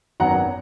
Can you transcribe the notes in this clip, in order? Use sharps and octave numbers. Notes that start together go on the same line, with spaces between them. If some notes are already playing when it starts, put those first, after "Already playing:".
G#1 F#2 D#3 F#3 B3 F#5 A#5